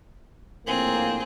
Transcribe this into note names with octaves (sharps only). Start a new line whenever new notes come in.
A#1 A2 A#3 C4 G#4